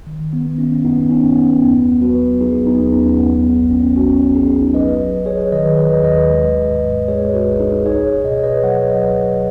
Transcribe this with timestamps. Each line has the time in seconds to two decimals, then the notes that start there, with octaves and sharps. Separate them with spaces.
0.07 D#3
0.33 B3
0.46 D#3
0.58 C#4
0.85 F#2 B3 D#4
1.11 C#4
1.23 F#2
1.36 B3
1.62 D#2 B3
2.01 F#3 F#4 B4
2.40 F#3 D#4 G#4
2.66 B3 D#4
2.80 D#2
2.92 C#4
3.18 F#2 B3
3.57 G#1
3.71 C#4
3.96 G#1 C#4 F#4
4.35 G#1 D#4 G#4
4.74 F#3 B4 D#5
5.14 F#3
5.26 G#4 C#5
5.52 D#3 B4 D#5
5.78 B4 D#5
5.91 D#2
6.04 B4 D#5
6.31 G#3
6.69 G#2
7.08 G#3 G#4 C#5
7.34 F#4 B4
7.47 G#1
7.60 D#4 G#4
7.86 C#2 G#4 C#5
8.24 B2 D#5
8.34 C#5
8.43 B4 D#5
8.63 F#3 C#5 F#5
8.90 B4 D#5
9.03 C#2